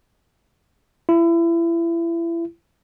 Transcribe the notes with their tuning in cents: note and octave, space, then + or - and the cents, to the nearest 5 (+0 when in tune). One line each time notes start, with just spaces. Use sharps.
E4 +30